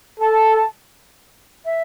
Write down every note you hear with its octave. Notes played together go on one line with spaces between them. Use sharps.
A4 A5
E5